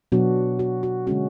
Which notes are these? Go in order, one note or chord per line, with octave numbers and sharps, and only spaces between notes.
B2 F#3 B3 D4 F#4
F#4
F#4
D3 G#3 C#4 F#4